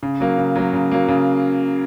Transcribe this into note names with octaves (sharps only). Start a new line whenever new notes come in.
C#3
F#3 A#3
C#3
F#3 A#3
C#3
F#3 A#3
C#3